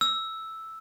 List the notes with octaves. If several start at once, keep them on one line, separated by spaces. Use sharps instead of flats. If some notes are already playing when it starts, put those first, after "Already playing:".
E6